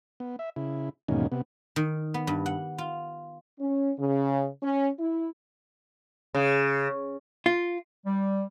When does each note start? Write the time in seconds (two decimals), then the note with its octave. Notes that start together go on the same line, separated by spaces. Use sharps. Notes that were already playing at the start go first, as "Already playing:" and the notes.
0.20 B3
0.39 E5
0.56 C#3 E4
1.08 E2 G#2 B2 D#3 A#3 C#4
1.32 C3 B3
1.76 D#3
2.14 B3
2.27 G2
2.46 F#5
2.78 F4
3.60 C#4
3.99 C#3
4.63 C#4
5.00 E4
6.35 C#3
7.46 F4
8.06 G3